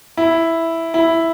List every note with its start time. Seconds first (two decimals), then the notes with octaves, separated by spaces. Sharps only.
0.17 E4
0.94 E4